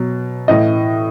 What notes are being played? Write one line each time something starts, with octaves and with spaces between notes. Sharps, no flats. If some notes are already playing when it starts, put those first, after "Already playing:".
Already playing: B2 F#3
A2 E3 D#5